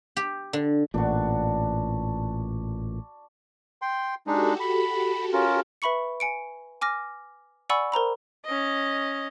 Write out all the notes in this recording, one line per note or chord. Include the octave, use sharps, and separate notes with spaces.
G4
D3
A1 A#2 D4 F#4
G5 C6
G#3 D4 D#4 F#4 G4 A4
B5
C#4 F4 A#4
B4 E5 B5 C#6 C#7
G#5 C#7 D7
G#5 D6 F6 A#6
D5 F#5 G#5 B5 C#6 E6
A#4 C5 A#5 B5
C#4 D#5